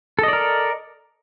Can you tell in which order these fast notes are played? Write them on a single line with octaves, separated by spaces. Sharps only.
A4 D#5 D5 A#4